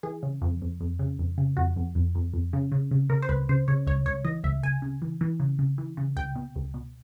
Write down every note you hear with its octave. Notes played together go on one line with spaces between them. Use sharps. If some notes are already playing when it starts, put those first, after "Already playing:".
E3 G#4
C#3
F2
F2
F2
C#3
F2
C#3
F2 F#4
F2
F2
F2
F2
C#3
C#3
C#3
C#3 A#4
C5
C#2 B4
C#3 C5
C#3 C#5
C#2 C#5
C#2 C#5
E3 D#5
C#2 E5
C#2 G#5
C#3
E3
E3
C#3
C#3
E3
C#3
C#2 G5
B2
C#2
B2